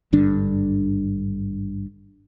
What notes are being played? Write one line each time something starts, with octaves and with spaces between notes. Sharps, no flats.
G#1 G2 D3 D4